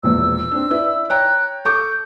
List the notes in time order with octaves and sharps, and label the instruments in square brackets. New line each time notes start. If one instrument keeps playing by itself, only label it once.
[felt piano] E1 A#1 E2 [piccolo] E6
[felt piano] C4 D4
E4 B4 D5
[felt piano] C#5 G5 A#5 [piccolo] F#6
[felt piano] A4 C#6 D6 [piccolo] G6